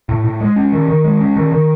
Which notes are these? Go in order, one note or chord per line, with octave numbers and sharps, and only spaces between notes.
A2
A2
G#3
C#4
D#3
D#3
G#3
C#4
D#3
D#3